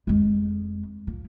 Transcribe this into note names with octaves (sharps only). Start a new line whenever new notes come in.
F2 G#3
F3